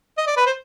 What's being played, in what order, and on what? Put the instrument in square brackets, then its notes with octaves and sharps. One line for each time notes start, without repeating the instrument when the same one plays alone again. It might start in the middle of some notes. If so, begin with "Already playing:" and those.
[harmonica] D#5
D5
B4
C5